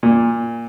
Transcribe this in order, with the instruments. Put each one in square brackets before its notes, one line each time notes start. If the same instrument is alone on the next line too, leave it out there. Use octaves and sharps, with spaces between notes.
[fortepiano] A#2